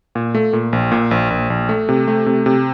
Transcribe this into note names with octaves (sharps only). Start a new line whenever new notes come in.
A#2
A3
A#2
A#1
A#2
A#1
A#1
A#1
A3
C3
A3
C3
C3